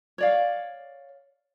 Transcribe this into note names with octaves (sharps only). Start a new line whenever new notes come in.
C#5 D5 F5